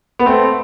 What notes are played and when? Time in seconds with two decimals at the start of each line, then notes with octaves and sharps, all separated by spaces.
0.19 B3
0.26 A3 C4